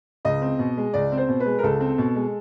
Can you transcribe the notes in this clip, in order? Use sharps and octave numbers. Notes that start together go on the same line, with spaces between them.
C#2 D#5
C4
B2
G#3
C#2 D5
C4
C5
B2
B4
G#3
A#4
C#2 A4
C4
B2
G#3